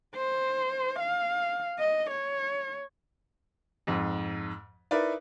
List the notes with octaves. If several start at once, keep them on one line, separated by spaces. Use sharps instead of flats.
C5
F5
D#5
C#5
F2 G#2
D#4 E4 A#4 B4 D5